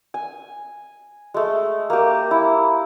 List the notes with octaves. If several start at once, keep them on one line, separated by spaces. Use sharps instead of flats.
G#5
G#3 A3
A#3 G4
E4